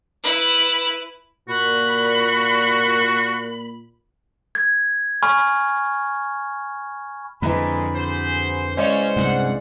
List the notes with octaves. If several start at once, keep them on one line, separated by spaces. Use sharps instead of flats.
E4 B4
A#2 F#4 B5
G#6
G#5 B5 C#6 F6
F2 D3 E3 F3 G3 G#3 A#5 B5
F#4 G#4 C5
C#3 G#3 C#4 C5 D5
C2 G2 G#4 F#5